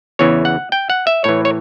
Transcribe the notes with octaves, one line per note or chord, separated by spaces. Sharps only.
E2 C#3 E3 C#5
F#5
G5
F#5
E5
A2 E3 C#5
C#5